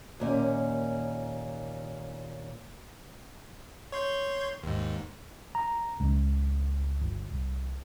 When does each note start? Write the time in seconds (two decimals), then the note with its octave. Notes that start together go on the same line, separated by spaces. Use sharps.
0.20 D#2 A#2 C#4
3.92 C#5 C6 G6
4.63 D#2 G#2
5.55 A#5
6.00 C#2
7.01 G1
7.31 C2